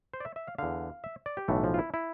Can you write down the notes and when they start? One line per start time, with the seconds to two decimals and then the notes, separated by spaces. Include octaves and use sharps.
0.14 C5
0.20 D5
0.25 E5
0.36 E5
0.47 F5
0.58 E2 D3 F5
1.04 E5
1.26 D5
1.37 G4
1.48 B1 A2 E3 A3
1.64 F3
1.74 F4
1.79 E4
1.94 E4